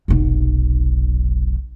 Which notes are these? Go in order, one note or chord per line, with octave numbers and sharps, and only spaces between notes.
F1 B1